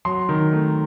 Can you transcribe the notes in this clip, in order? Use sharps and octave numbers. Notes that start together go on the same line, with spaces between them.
F#3 C6
D#3
A3